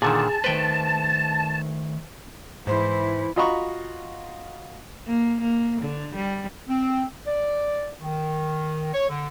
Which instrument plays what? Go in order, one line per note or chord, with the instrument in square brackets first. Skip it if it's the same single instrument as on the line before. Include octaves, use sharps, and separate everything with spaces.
[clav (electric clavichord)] A#2 D3 D#3 [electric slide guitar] G#4 [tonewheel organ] A5
[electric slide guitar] D#3 A3 C5 [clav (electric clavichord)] B4 G5
[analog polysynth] G#2 [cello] E3 E4 [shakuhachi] C5
[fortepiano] F4 F#4 D#5 A#5 B5 C#6
[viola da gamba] A#3
A#3
D3
G3
[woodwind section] C4
D5
D#3
C#5
D3